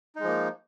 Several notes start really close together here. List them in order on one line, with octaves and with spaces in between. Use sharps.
D#4 G#3 F3 A#3